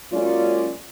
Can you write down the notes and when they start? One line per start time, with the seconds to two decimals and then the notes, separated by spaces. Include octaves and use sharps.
0.13 F#3 G#3 A#3 C#4 F4 D5